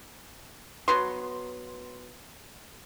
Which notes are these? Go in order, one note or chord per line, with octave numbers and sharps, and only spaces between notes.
F#3 B3 C6